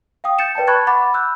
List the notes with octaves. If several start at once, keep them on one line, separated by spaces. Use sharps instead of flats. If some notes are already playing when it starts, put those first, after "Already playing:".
F5 G5 D#6
G6 A6 C#7 E7
B4 D5 G5 A5
A5 B5 C#6 F#6 G#6 A6
F#5 B5 D6 A6
B5 E6 F#6 G6